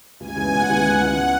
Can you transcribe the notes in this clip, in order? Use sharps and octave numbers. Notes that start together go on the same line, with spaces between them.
C#2 G#5
C#3 E3 G#3 B3
C#2 F#5
C#3 E3 G#3 B3
C#2 F#5
C#3 E3 G#3 B3